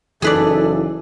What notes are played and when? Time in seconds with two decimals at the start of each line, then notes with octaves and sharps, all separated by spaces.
0.22 F#1 E3 D#4 G#4 A4 B4 D5